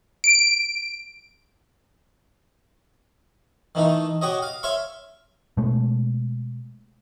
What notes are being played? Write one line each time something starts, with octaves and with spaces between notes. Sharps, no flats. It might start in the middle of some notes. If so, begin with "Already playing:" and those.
D7
D#3 E3 A3 D#4
F#4 G4 C#5 D#5
F5
C#5 E5 F5 C6 C#6
B2 G#3 A3